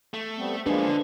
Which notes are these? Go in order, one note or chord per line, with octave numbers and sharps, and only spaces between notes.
A3
G3 B3 C4
F3 G3 G#3 A#3 D4 G#4 B4
D3